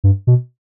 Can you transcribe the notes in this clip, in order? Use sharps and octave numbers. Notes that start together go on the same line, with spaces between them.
G2
B2